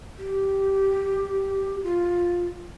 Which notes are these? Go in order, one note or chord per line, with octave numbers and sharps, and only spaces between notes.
G4
F4